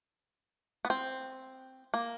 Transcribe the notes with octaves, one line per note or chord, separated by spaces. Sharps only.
B3
C4
A#3